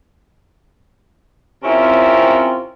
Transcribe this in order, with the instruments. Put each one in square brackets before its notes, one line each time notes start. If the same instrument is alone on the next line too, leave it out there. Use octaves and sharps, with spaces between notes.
[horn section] C3 C4 C#4 E4 F4 A#4